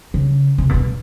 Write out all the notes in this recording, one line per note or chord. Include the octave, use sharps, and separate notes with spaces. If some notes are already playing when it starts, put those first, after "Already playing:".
C#3
C3
A#2
B2